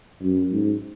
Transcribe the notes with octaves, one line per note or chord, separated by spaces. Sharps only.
F#2
G#2